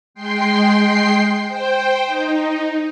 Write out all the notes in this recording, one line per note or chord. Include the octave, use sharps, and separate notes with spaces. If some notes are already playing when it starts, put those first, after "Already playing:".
G#3 G5 C6 C7
C5 G5
D#4